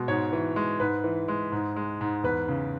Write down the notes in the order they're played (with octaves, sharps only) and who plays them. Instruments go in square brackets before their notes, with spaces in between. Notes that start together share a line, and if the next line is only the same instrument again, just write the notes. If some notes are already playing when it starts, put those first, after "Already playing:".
Already playing: [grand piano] B2 G#3
G#2 C#5
E3
G#3
G#2 B4
E3
G#3
G#2
G#3
G#2
E2 B4
C#3